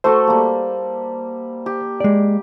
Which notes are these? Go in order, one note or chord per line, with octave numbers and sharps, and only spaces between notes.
A3 F#4 A4 C5
G3 A#3
G4
G#3 D5